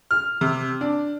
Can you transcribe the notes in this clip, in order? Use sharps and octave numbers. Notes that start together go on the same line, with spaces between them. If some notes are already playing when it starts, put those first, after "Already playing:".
F6
C3
D4